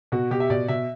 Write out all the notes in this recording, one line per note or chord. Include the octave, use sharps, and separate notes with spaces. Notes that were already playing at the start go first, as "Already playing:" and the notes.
B2 F#4
B2 G4
E5
B2 D5
B2 E5